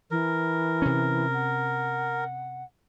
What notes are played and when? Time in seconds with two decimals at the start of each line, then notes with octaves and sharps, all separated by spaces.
0.11 E3 A#4
0.82 C3 C#4
1.34 F#5